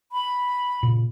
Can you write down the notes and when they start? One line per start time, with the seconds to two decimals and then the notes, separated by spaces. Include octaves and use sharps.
0.12 B5
0.83 A#2 C#3